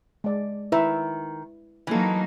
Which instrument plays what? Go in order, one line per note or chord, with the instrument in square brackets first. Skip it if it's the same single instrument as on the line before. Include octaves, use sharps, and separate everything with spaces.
[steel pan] G#3 D5
[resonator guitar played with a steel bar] D#3 [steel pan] E4 B4 E5
[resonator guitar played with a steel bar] E3 A4 [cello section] F#3 A#3 D#4